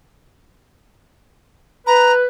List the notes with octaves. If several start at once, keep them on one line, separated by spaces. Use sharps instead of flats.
B4 A#5